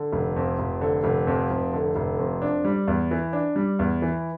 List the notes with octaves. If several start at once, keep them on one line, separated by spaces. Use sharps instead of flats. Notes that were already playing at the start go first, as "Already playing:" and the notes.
Already playing: D3
F1
F2
F1
D3
F1
F2
F1
D3
F1
F2
D4
G3
E2
E3
D4
G3
E2
E3